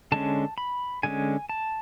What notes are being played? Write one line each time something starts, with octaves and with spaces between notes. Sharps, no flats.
D3 G#3 C#4 A5
B5
D3 G#3 C#4 G#5
A5